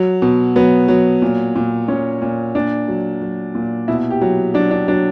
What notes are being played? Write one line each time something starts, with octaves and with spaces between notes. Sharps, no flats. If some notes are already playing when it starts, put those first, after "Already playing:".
Already playing: F#3
B2
F#3 B3
F#3
A#2
A#2
A#2 C#4
A#2
A#2 D4
F#3
F#3
A#2
B2 E4
G4
F#3
F#3 D4
D4
F#3 D4